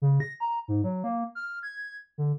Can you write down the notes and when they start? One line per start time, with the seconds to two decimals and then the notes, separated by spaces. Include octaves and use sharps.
0.02 C#3
0.20 A#6
0.40 A#5
0.68 G#2
0.84 F#3
1.04 A#3
1.35 F6
1.63 G#6
2.18 D3